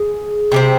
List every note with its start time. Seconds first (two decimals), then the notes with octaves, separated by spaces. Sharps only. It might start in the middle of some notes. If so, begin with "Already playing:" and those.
Already playing: G#4
0.52 C3 G3 C4